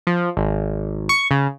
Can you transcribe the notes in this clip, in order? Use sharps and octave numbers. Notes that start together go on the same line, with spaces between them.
F3
G#1
C#6
C#3